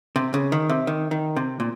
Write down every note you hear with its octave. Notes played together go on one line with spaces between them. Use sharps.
C3
C#3
D#3
C3
D#3
D#3
C3
A#2